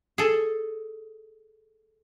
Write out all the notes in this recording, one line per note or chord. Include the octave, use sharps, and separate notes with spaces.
G#4 A4